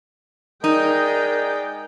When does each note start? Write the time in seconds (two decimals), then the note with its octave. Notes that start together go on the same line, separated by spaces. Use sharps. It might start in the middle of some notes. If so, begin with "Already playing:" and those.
0.64 G#3 D#4 A#4 D5 G5 G6